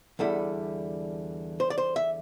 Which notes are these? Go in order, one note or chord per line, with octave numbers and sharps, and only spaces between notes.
E2 D3 G3 E4 A4
C5
D5
C5
E5